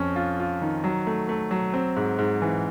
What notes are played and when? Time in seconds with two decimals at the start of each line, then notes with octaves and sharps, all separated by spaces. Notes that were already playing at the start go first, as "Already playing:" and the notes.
Already playing: F2 C#4
0.16 F4
0.40 F4
0.62 D#3
0.84 F#3
1.07 A3
1.29 A3
1.51 F#3
1.74 C4
1.96 G#2
2.18 G#2
2.42 E3